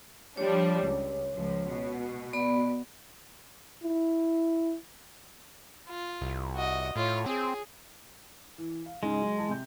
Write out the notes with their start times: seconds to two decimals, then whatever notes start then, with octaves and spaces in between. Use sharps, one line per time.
0.37 F3 G3 D4 C#5
0.84 C#2
1.34 C#2 F3
1.69 B2
2.33 B3 D5 B5
3.83 E4
5.88 F4
6.22 C2
6.55 F#4 D#5
6.96 A2 F4 C#5
7.26 C4 G#4
8.58 E3
8.86 F5
9.03 C#2 G#2 C#3 G#3
9.22 F#3
9.38 E2 G#4 A5
9.49 C3 G6